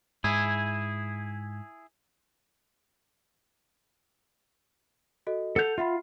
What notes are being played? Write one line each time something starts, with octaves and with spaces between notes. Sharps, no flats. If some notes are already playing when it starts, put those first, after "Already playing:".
G#2 E4 G#4
F#4 A4 D#5
A4 F#5 G6 F7
F4 E5 F#5 B5